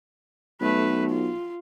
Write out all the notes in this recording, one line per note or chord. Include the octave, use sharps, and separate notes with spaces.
B1 A3 B4
F4